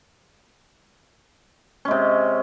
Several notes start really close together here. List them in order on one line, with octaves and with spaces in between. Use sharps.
C#4 G#3 C3